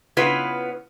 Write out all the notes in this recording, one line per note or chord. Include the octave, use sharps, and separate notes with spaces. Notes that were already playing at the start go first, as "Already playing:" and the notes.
C#3 B3 E4 F4 B4